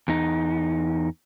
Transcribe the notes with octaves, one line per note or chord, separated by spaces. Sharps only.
E2 D#4